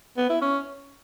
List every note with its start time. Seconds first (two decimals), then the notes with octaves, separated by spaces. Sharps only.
0.18 B3
0.30 E4
0.42 C#4